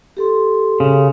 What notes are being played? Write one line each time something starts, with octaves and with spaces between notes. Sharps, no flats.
G4 A4 C6
C#3